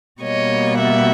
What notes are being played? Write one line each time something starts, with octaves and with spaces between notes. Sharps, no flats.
B2 G3 A#3 C#5 D#5
E5 F#5